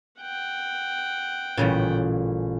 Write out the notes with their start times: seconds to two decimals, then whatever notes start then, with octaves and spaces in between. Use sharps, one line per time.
0.21 F#5 G5
1.57 A1 A#2 C#3 G3 B3